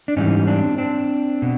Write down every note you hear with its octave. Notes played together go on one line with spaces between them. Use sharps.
D4
G#2 E3 G3 C#4 D#4
C4 D4
C4 D4
B2